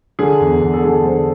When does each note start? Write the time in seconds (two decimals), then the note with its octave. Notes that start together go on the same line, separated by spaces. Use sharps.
0.19 D3 G#4
0.41 E2
0.62 E2
0.74 A4
0.84 D3 G#4
1.05 D3 C5